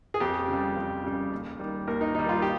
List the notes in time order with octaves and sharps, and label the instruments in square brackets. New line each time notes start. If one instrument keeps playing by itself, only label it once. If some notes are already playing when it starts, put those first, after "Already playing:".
[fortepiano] G#4
F2 G4
C#3 G3
F2
C#3 G3
D#2
D#3 G3
D#2 A#4
D#4
D#3 G3 D#4
F4
G4